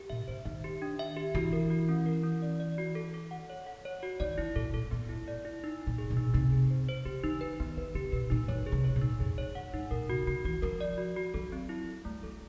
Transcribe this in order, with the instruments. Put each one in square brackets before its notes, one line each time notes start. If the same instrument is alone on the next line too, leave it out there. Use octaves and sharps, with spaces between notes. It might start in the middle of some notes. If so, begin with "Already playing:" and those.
Already playing: [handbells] G4
[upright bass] A#2 [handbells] E5
[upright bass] A#2 [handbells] C5
[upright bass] D#3 [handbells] E5
[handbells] G4
D4
E5
G4
[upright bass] E3 [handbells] F#4
[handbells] A#4
F#4
C#4
A#4
C#4
D5
D5
F#4
A4
A4
F#5
C#5
F#5
C#5
F#4
[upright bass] D#3 [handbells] D5
[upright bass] E3 [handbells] E4
[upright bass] A#2 [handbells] A4
[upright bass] A#2 [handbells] A4
[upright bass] A#2 [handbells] B3
[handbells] E4
[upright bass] A2
[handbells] D5
E4
D#4
D#4
[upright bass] A#2
[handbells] G#4
[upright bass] B2
[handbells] D#4
[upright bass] C3 [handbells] D#4
[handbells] G#4
C5
C5
[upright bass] C#3 [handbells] G4
[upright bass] D#3 [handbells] D#4
[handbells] B4
[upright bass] D#3 [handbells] B3
[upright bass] D#3 [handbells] B4
[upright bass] C#3 [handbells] G4
[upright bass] B2 [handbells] B4
[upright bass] A#2 [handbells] D#4
[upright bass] F#2 [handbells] C#5
[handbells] G#4
[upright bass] C3
[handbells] C#5
[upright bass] A#2
[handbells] D#4
[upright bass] F2 [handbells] G#4
[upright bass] F2 [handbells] C#5
[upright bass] F#2 [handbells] F#5
[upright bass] G#2 [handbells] D#4
[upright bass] A#2 [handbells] A#4
[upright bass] C3 [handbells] F#4
[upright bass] C#3 [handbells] F#4
[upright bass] E3 [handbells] F#4
[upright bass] F3 [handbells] A#4
[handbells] D5
F#4
F#4
[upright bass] F#3 [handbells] A4
[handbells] C4
E4
E4
[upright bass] G3 [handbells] A3
[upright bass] F#3 [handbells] A4